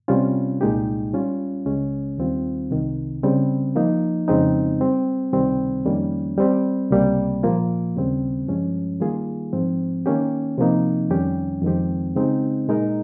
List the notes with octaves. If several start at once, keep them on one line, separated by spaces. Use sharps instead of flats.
C3 G3 C#4 F4
C2 A#2 G#3 D#4 G4
G3 C#4 F4
C#2 C#3 G#3 C#4
D#2 D#3 G3 C4 F4
C2 C3 D#3
C#3 G3 C4
F3 A#3 D#4
F2 C#3 G#3 C4 D#4
G3 C4 G4
C#2 C3 D#3 G3 C4
F2 D#3 G3 A#3 C#4
G3 C4 G4
C#2 C3 G3 A#3
A#2 F3 A#3 F4
D#2 C#3 G3 C4
G2 F3 G#3 C#4
D#3 G3 A#3 F4 G#4
G#2 F3 C4
D#3 A#3 C#4 G4
C3 F3 A#3 D#4
F2 D#3 G3 C#4 G4
F2 D#3 G#3 C4 G4
C#3 G#3 C4 D#4
A#2 G#3 D#4 A#4 D#5